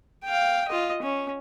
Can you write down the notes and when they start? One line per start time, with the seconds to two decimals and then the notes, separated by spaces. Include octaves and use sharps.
0.25 F5 G5
0.68 F4 D#5
1.02 C#4